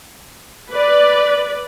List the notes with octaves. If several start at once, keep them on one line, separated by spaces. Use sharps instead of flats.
B4 D5